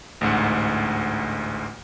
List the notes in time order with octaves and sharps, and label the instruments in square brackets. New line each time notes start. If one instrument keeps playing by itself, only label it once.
[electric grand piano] A1 D2 G#2 F#5